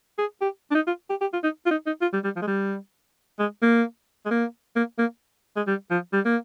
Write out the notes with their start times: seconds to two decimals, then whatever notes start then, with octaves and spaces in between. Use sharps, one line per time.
0.18 G#4
0.41 G4
0.71 D4
0.75 D#4
0.87 F4
1.10 G4
1.21 G4
1.33 F4
1.44 D#4
1.66 F4
1.71 D#4
1.86 D#4
2.02 F4
2.13 G3
2.24 G3
2.36 F3
2.42 G#3
2.47 G3
3.39 G#3
3.62 A#3
4.26 G#3
4.31 A#3
4.76 A#3
4.99 A#3
5.56 G#3
5.67 G3
5.91 F3
6.13 G3
6.25 A#3